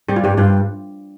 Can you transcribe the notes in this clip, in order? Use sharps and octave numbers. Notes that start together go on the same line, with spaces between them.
G3 G4
F4
G2 G4
G2 F4